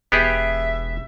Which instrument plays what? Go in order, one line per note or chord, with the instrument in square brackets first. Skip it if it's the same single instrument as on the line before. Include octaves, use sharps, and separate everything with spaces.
[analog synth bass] E1 [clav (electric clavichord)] B3 G4 G#4 [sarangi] E5